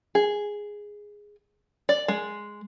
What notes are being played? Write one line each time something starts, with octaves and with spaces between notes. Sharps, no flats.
G#4
D5
G#3